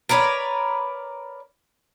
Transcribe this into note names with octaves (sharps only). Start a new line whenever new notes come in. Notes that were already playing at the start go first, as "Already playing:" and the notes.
A#4 B4 C#5 D5